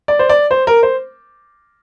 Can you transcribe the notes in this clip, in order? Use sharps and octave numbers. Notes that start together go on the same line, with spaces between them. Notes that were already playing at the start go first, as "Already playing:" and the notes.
D5
C5
D5
C5
A#4
C5